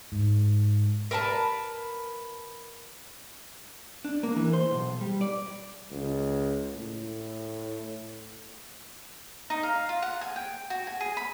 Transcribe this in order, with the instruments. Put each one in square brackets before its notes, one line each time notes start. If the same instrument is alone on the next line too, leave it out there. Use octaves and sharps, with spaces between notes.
[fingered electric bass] G#2
[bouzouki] A#4 B4 G#5 A5
[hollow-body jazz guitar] D4
A#3
E3
C5
B1
G3
D5
[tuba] C#2
A2
[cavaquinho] D#4
F5
F4
F#5
G#5
G5
F#4
G#5
G#4
B5